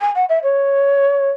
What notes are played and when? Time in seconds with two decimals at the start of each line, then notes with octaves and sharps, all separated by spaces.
0.01 G#5
0.15 F#5
0.29 E5
0.43 C#5